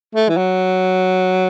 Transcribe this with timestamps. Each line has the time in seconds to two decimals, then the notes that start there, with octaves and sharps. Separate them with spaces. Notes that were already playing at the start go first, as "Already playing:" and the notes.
0.15 A3
0.29 E3
0.37 F#3